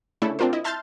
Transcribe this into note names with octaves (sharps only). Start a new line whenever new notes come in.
C#3 A3 C#4 D4 E4 A4
C4 D4 F4 A#4 C5
E4 D#5
E5 A5 C6 F6 G6 A6